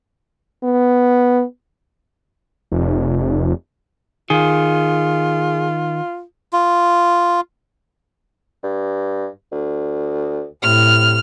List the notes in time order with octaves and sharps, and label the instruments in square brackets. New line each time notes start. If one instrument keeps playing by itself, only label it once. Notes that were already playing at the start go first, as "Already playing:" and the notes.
[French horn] B3
[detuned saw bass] F1
[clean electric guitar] D#3 [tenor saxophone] F4 [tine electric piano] G#4
[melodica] F4
[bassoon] G2
D2
[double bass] A2 [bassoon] C3 [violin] F6